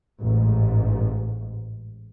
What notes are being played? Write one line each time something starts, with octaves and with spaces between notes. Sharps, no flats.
A1 G#2